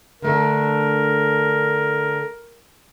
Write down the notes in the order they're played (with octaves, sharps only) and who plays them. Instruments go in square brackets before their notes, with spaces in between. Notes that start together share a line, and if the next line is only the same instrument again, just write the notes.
[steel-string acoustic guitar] D3 A3 D4 [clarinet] A#4